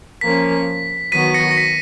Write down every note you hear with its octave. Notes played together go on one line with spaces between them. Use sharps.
F3 A#3 C#4 B6
D#3 F#3 B3 F#4 B6 D#7
A#6 C#7
A#6
B6